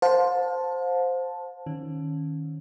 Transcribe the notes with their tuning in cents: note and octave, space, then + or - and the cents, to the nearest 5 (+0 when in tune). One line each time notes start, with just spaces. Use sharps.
C5 +0 F5 +40 A5 +0
D#3 +0 C#4 +0